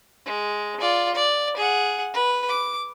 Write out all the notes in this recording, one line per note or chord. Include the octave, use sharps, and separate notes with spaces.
G#3
F4 D5
D5
G#4 F#5
B4
D6